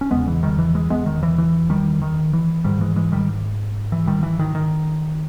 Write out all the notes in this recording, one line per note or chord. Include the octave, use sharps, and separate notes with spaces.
C#4
E2 C#3 G#3 B3
E3
D#3 G3
E3
E3 G#3
G#3 B3
D#3
E3
E3
D#3 G3
D#3
E3
G#2 D#3 G3
E3 G#3
E3 G#3
D#3 G3
E3
D#3 G3
E3
D#3
D#3